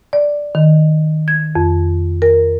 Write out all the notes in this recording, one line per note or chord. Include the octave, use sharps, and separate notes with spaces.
D5
D#3
G#6
F2
A#4